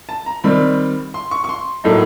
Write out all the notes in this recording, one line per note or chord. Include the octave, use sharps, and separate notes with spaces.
A5
A#5
D#3 G3 C4 B5
C6
C#6
C#6
C6
A2 F#3 A#3 D#4